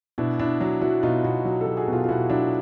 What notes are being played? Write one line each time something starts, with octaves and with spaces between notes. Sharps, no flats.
B2 D4 E4
B2 D4 E4
F#3
F#3 E4 F#4
B2 D#4 F4
B2 E4 F#4
F#3
F#3 G4 A4
F#4 G#4
B2
F4 G4
F4
B2 E4 F#4
F#3 D4 E4